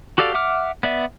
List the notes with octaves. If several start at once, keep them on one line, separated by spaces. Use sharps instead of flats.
F#4 G4 A4 D5 F5
E5 F#5 D6 F6
B3 D5 E5